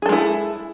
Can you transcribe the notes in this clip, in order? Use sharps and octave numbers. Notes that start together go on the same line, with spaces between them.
G#3 E4 G#4 A4